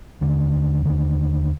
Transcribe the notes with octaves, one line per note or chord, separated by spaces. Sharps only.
D#2 D3
D#2 D3